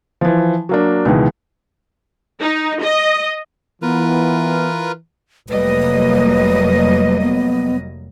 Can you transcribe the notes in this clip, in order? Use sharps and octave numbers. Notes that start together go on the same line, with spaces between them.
E3 F3
F#3 A#3 D4
C#2 B2 D#3 E3
D#4
D#5
E3 B3 F4 A#4 B4
F1 F#3 G3 A3 A#3 B4 D#5
B3